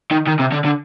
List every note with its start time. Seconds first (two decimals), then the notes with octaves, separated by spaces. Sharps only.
0.11 D#3
0.27 D#3
0.39 C3
0.52 D3
0.65 D3